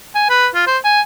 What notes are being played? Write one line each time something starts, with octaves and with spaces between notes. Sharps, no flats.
G#5
B4
F4
C5
G#5